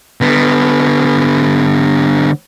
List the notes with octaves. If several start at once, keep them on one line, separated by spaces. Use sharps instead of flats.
D3 B3